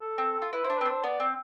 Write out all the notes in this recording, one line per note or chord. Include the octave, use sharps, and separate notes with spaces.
A4
C4
F4
E4 B4
E4 C5
D4
C4 B4
D4 C5
B3 D5
C4